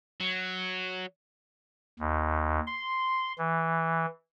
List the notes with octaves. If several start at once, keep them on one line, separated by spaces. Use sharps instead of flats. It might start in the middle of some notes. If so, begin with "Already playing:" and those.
F#3
D#2
C6
E3